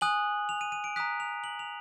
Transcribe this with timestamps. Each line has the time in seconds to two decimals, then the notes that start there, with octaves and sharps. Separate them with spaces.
0.01 G#5 D#6 F#6 F#7
0.49 F7
0.61 D#7
0.72 D#7
0.84 D7
0.96 A#5 D#6 F#6 B6
1.20 F7
1.44 F#7
1.59 F7